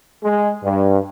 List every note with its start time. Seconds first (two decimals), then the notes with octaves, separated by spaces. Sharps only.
0.23 G#3
0.63 G2